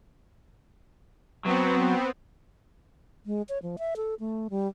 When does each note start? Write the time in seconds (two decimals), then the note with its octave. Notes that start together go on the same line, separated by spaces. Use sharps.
1.45 F#3 B3 C4
3.26 G#3
3.49 C#5
3.62 F3
3.78 E5
3.96 A4
4.20 A3
4.50 G3